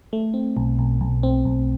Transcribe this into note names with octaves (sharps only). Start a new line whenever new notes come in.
A3
C4
B1
B1
B1
C4
B1